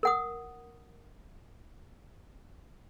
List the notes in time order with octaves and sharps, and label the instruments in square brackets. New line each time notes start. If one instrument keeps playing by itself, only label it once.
[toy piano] A#4 F#5 D#6